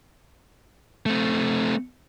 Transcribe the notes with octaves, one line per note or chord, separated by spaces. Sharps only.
A3 C4